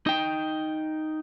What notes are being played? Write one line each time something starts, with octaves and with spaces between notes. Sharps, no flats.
D#4 G5